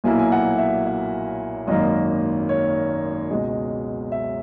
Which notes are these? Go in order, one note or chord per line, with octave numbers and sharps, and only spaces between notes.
B1 A#2 F#3 A#3 E4 G#5
G#5
F#5
E5
E5
G#1 F#2 D#3 A#3 D#5
C#5
C#2 B2 G#3 D#5
E5